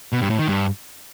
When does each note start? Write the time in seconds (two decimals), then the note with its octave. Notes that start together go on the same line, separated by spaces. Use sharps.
0.13 B2
0.21 G2
0.30 A2
0.39 D#3
0.48 G2